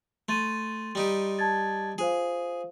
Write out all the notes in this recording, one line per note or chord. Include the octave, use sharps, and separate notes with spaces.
A3 C6 A6 D#7
G3 D#4 G4
A5 G#6 A6
F4 G#4 C5 F5